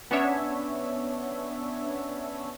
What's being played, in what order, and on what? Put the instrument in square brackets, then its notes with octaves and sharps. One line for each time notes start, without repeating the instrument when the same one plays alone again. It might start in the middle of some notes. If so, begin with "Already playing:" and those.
[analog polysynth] B3 C#4 D4 C#5 E5